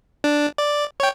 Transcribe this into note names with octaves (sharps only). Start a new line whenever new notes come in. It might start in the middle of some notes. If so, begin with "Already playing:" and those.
D4
D5
C#5 G5